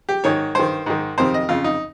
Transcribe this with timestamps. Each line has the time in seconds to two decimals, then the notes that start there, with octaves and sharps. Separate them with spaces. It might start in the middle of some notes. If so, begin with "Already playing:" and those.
0.09 G4
0.24 G#2 D#3 C#5
0.55 G2 D#3 C5
0.86 G#2 D#3
1.18 F2 C3 D#3 C5
1.34 D#5
1.49 F2 C#3 F4
1.64 D#4